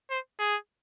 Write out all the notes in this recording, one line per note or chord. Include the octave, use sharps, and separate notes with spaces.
C5
G#4